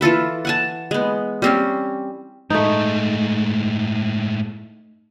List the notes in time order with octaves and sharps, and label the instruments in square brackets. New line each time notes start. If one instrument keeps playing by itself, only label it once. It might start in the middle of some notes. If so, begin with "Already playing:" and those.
[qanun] E3 F4 A4 B4
F#5 G#5 A5
G#3 B3
G3 C4 C#4
[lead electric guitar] A2 G#3 [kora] A3 D#4